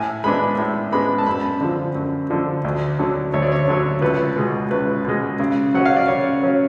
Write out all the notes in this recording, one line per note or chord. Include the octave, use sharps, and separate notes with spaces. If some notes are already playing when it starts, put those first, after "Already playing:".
Already playing: A2 G#5
G#3 B3 D4 B5
A2
G#3 B3 D4 B5
A5
F#2 B5
D3 F3
F#2
D3 F3
D2
D3 F#3
D2 C#5
D5
C#5
D3 F#3
C#2 B4
B2 G#3
C#2 B4
B2 G#3
C#3
F#3 C#4 F#5
F5
D5
C#3 C#5
F#3 C#4